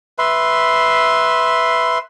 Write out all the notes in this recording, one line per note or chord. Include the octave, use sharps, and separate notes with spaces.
B4 E5 C6